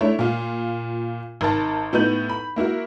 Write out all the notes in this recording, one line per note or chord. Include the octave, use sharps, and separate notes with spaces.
A3 D4 E4 C#5
A#2 F4
G#1 A#4 A5
A2 B3 D#4 B4 G6 F#7
B5
A#3 E4 F#4 A#4